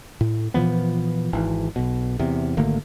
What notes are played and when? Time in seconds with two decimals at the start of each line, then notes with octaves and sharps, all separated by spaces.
0.21 A2
0.54 A#2 E3 F3 B3
1.33 G#1 E3
1.76 B1 B2
2.19 E2 C3
2.57 G#1 D3 A3 A#3